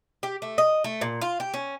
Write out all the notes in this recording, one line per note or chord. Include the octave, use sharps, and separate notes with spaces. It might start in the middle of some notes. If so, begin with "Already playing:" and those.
G4
A3
D#5
A3
A#2
F4
G4
C#4